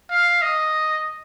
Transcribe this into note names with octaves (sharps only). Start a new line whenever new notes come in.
F5
D#5